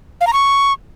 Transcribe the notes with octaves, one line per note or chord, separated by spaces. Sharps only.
F5
A#5
C#6